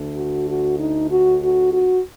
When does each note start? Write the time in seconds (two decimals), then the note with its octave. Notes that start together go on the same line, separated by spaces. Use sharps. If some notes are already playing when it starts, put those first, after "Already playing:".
Already playing: D2 D3
0.16 F#4
0.47 F#4
0.78 D#4
1.09 F#4
1.40 F#4
1.71 F#4